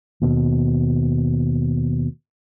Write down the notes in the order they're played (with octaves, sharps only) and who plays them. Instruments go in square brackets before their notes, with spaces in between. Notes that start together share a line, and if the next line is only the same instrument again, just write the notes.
[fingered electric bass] D#2 B2